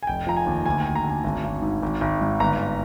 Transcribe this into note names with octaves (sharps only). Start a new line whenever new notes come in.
G#5
F1 G5
F3 A#5
G#5
D#2
D2 G#5
D2 G5
A#5
D3
G#5
G#1
G#1
G#2
G#1
G#1
G#2
G1 A#5